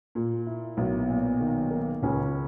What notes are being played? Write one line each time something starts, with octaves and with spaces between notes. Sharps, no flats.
A#2 A#3
E4
B1 B2 A#4
A#2
D#3
A#3
C#2 C#3 C#4